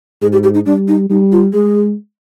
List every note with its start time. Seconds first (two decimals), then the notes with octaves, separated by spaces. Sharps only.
0.21 G#2 G#4
0.33 G4
0.43 G4
0.54 D#4
0.66 G3 D4
0.88 D#4
1.10 G3 D#4
1.32 F4
1.53 G#3 G#4